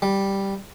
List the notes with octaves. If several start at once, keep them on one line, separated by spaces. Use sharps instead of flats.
G3